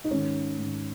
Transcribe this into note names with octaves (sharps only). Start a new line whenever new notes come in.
D#4
G#2 D#3 C#4
G#2 D#3